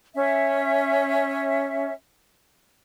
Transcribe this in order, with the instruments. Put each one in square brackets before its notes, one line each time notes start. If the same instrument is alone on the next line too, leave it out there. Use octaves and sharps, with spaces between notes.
[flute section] C#4 E5